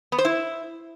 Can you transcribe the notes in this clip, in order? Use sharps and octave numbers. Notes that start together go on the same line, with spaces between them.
B3
C5
E4